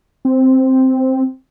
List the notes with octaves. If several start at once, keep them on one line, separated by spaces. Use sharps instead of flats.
C4